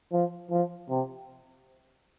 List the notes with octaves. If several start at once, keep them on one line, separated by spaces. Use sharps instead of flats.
F3
F3
C3